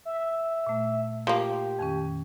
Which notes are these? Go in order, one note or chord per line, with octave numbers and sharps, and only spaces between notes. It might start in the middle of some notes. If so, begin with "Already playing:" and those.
E5
A#2 A3
F3 A#3 G4
F2 D#3 C#4